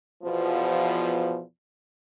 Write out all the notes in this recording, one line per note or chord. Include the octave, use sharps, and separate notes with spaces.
E2 B2 F3